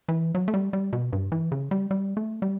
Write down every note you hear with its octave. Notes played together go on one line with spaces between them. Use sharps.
E3
F#3
A3
G3
G3
B2
G2
E3
C#3
G3
G3
A3
G3